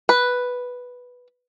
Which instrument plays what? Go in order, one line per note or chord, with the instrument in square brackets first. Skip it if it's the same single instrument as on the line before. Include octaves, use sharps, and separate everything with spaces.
[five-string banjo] B4